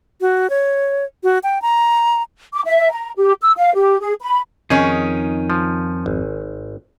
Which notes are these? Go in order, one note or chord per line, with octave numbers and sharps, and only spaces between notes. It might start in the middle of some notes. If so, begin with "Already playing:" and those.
F#4
C#5
F#4
G5
A#5
D6
E5
A#5
G4
E6
F5
G4
G#4
B5
F2 D#3 C#4 D#4 G#4
F3
G#1